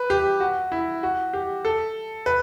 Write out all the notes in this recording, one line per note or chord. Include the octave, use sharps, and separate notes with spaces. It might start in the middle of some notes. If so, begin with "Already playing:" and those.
Already playing: B4
G4
F#4
E4
F#4
G4
A4
B4